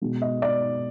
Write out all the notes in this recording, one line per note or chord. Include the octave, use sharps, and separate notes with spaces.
B2 G#3
D#5
D5